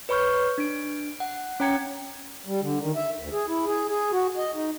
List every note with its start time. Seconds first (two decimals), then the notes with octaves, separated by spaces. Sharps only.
0.09 B4 C#5 B5 C#6 F6 G6
0.58 D4 D7
1.20 F#5
1.60 C#4 C#5 G5 A#5 G#6 C#7
2.46 G3
2.61 D3
2.80 D#3
2.96 E5
3.19 D2
3.32 G#4
3.48 E4
3.66 G#4
3.89 G#4
4.12 F#4
4.37 D#5
4.54 D#4